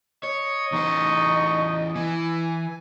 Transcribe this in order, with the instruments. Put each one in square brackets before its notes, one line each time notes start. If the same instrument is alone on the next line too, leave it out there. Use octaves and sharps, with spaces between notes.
[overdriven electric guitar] C#5 [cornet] D#5
[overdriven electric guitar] E2 C5 [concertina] D#4 C#6
[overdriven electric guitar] E3 [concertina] G#5